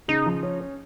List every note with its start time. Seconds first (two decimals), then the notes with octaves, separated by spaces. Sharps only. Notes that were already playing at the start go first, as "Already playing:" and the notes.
0.08 C#3 D#4
0.26 F3
0.43 C#4
0.60 C#4